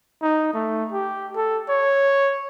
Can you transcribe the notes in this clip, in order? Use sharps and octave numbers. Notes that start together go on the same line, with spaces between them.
D#4
A3
G4
A4
C#5